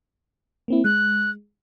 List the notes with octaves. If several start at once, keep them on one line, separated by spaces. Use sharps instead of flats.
A#3 C4 E4
G#3 F#6